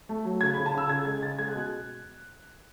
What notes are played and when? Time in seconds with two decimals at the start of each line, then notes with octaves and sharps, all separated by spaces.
0.09 A3
0.25 F#3
0.41 C#3 G#6
0.54 B5
0.57 C#3
0.66 A5
0.74 C#3 E6
0.89 C#3 G#6
1.05 G#3 G#6
1.22 C#3 A6
1.38 G#3 G#6
1.50 F#6
1.55 B2